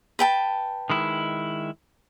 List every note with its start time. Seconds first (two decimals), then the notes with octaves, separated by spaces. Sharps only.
0.19 B4 G5 A5
0.90 D#3 G#3 E4